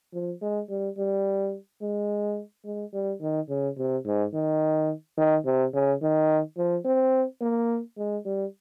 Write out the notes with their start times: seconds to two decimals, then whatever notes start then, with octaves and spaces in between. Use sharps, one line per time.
0.14 F3
0.42 G#3
0.69 G3
0.97 G3
1.82 G#3
2.65 G#3
2.94 G3
3.21 D#3
3.49 C#3
3.78 C3
4.06 G#2
4.34 D#3
5.18 D#3
5.45 C3
5.74 C#3
6.02 D#3
6.58 F3
6.85 C4
7.41 A#3
7.98 G#3
8.25 G3